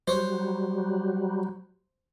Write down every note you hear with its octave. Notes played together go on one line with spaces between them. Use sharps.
F#3 G3 C5 C#5